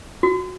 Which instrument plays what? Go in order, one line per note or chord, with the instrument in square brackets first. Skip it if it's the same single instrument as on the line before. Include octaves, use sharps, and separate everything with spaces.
[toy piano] F#4